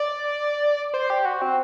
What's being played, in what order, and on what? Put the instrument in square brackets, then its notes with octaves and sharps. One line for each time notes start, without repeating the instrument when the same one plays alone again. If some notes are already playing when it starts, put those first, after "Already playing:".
Already playing: [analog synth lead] D5
C5
G4
F#4
C4